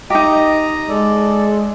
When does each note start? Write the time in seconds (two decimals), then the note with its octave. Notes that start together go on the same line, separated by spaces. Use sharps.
0.10 D#4 G4 D#5 A#5
0.89 G#3 A4 D5